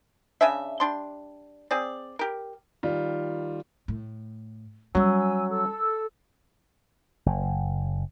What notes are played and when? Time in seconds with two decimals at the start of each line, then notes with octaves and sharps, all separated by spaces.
0.41 C#3 C#4 D4 E5
0.80 G3 D4 C6
1.71 C4 G#4 D5
2.19 G4 A#4
2.83 D#3 G3 F4
3.88 A2
4.95 F#3 G3 C#4 G#5 E6
5.50 A4 E6
7.26 F#1